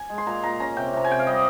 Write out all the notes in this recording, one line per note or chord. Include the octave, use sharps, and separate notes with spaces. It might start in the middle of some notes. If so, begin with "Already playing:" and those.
Already playing: G#5
G#3
C6
A#2 A#5
A#2 A#5
C#4 A#5
C3 G5
C3 A#5
G#5
C3 G5
F5
G3 D#5